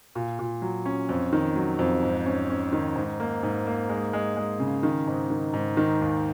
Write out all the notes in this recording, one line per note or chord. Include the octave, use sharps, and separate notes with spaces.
A#2
A#2
F#3
C#4
F2
D#3
F#3
F2
G#2
C#4
C#4
D#3
G#2
A#3
G#2
A#3
G#3
G#3
G#3
C#3
D#3
G#2
D#3
G#2
D#3
D#2